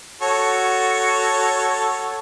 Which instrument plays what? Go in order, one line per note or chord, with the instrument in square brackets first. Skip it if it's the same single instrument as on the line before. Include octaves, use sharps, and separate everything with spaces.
[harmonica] F#4 A4 C#5